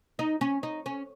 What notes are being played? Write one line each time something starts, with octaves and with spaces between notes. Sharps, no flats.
D#4
C#4
D#4
C#4